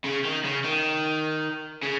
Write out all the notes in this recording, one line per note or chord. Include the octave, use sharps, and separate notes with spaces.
C#3
D#3
C#3
D#3
C#3